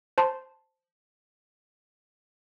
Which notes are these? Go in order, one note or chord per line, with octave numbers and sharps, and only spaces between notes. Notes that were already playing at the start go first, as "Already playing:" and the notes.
C5 A5 C6